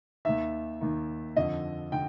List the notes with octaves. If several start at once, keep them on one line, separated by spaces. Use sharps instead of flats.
D#2 D#3 E5
D#2 D#3
F2 D3 D#5
D3 G5